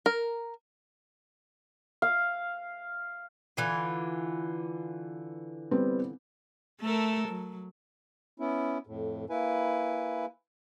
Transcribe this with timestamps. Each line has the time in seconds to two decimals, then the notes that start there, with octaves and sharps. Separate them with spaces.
0.06 A#4
2.02 F5
3.57 D3 E3 F4
5.71 G3 B3 C4
6.81 A3 A4 A#4
7.28 F#3
8.40 B3 C#4 E4
8.87 F2 A2
9.30 A#3 E4 B4 G#5